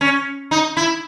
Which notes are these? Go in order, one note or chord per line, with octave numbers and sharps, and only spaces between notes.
C#4
D#4
E4